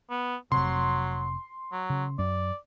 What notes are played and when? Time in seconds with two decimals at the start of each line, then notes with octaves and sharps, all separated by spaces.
0.10 B3
0.52 F1 C3 F#3 C6
1.72 F#3
1.90 C#3
2.19 F#2 D5